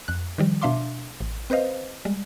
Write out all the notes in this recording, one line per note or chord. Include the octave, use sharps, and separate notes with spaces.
F2 F#6
D#3 F3 G3
B2 D4 E5 F5 C6 D6
A1
C4 B4 C5 D#5 F5
G3 G#3